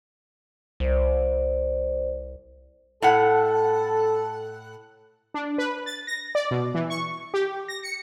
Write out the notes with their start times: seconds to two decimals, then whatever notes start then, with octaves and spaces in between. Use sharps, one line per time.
0.80 C2 C5 D5
3.02 A2 A4 F#5
5.34 D4
5.58 B4
5.86 A6
6.07 A#6
6.35 D5
6.51 B2
6.74 E3
6.90 C#6
7.34 G4
7.68 A#6
7.83 C#7